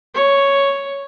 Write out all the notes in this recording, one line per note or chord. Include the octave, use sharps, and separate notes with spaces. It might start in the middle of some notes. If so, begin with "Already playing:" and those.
C#5